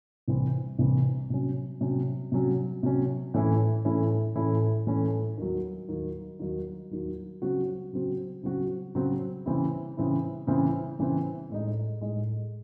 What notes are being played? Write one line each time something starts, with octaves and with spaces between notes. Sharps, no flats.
C2 C3 E3 C4
C2 C3 E3 C4
C3 F#3 C#4
C3 F#3 C#4
C3 F#3 C#4
C3 F#3 C#4
A2 E3 A3 C#4 E4
A2 E3 A3 C#4 E4
A2 E3 A3 C#4 E4
A2 E3 A3 C#4 E4
D#2 D#3 F#3
D#2 D#3 F#3
D#2 D#3 F#3
D#2 D#3 F#3
C#3 F#3 C4 F#4
C#3 F#3 C4 F#4
C#3 F#3 C4 F#4
C#3 F#3 C4 F#4
C#3 E3 C4 E4
C#3 E3 C4 E4
C#3 E3 C4 E4
C#3 E3 C4 E4
A2 G#3 D#4
A2 G#3 D#4